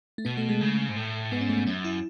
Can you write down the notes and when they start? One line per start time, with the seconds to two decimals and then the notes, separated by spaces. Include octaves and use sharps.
0.18 A3
0.25 B2 B3
0.37 A3
0.49 G#3
0.61 C#3
0.89 G#2
0.96 A2
1.31 G#2 B3
1.41 C#4
1.49 A3
1.57 B3
1.66 F#2 C#4
1.85 E4